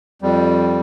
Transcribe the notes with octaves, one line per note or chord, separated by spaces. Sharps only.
F2 G3